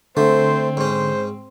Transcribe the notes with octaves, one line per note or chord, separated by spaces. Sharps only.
D3 A3 C4 C5
G#2 C#4 C5